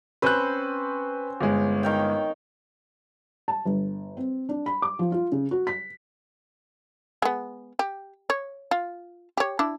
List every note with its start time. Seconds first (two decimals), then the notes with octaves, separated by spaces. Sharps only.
0.22 C4 C#4 B4 C5 F#6
1.41 G1 G#3
1.83 D#3 F5 G5
3.48 A5
3.65 G1
4.17 C4
4.49 D4
4.66 B5
4.82 D6
4.99 F3
5.12 F4
5.32 C#3
5.51 F#4
5.67 B6
7.22 G#3 B3
7.79 G4
8.30 C#5
8.71 F4
9.37 G4 C#5
9.59 D4 E4